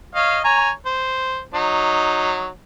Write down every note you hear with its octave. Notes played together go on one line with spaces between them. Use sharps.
C#5 D#5 F5
C#5 G#5 A#5
C5
F#3 D#4